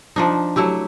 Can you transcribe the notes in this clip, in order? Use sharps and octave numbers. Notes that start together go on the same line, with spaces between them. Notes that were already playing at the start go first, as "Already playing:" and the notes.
F3 D4 D#4
F#3 A3 E4 G4